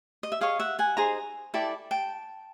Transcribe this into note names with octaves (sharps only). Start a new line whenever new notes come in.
D#5
E5
G#4 C#5 D#5 F5
E5 F#5
F#5 G#5
D#4 G#4 C5 G#5 A#5
E4 A4 D5 G5 A5
G5 A5